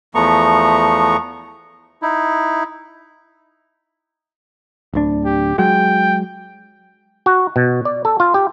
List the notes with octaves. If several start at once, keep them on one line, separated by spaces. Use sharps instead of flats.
E2 F3 A3 B3 A#5 C#6
D#4 E4
D1 D2 D4
G4
F#3 G#3 G5
F#4
B2
D5
A4
F4
G4